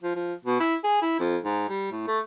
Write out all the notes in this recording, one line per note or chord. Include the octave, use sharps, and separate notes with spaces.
F3
F3
B2
E4
G#4
E4
F2
G#2
G3
A2
A3